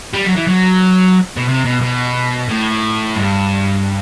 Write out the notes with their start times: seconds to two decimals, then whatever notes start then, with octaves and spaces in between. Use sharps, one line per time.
0.13 G3
0.25 F#3
0.36 E3
0.47 F#3
1.37 B2
1.48 C3
1.65 B2
1.81 B2
2.49 A2
3.16 G2